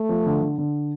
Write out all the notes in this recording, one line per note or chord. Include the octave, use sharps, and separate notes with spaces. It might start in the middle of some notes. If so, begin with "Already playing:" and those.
Already playing: A3
F3
D3
D3
D3